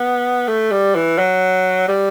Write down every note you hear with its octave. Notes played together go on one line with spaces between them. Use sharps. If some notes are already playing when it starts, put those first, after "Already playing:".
Already playing: B3
A3
G3
E3
F#3
G3